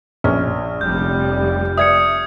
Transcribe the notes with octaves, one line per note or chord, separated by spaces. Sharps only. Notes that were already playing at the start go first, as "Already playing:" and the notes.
A#1 C#4 F6
F1 G3 G6
D5 E5 D#6 G#6 C#7